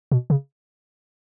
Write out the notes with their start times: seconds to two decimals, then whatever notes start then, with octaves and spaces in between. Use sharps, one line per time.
0.12 B2
0.30 C#3